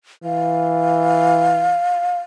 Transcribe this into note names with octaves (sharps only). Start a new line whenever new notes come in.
E3 F5